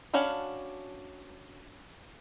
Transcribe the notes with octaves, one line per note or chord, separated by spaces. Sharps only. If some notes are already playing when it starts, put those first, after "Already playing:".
C#4 D4 F#4 F5 B5